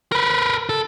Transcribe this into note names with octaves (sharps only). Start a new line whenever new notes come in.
A#4 B4
A4